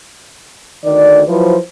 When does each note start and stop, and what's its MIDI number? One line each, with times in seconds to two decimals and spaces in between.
0.85 1.23 38
0.85 1.23 51
0.85 1.23 74
1.28 1.56 53
1.28 1.56 54
1.28 1.56 64
1.28 1.56 71
1.28 1.56 72